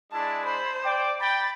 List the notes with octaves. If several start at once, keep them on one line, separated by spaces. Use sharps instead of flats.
G#3 D4 E4 A5
C5 B5
D5 G5 D6
G5 B5 A6